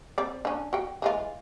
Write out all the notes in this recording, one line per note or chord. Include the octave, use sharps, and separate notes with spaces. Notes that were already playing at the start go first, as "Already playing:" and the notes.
C4 D5
C#4 D4
F#4 G5
E3 G#3 F4